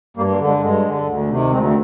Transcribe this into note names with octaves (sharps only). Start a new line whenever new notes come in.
G2 G3 A#3
G3 A#3
D3
G#3
G2 G#3
D3
D2
C3 D#3
D2 G#3 C4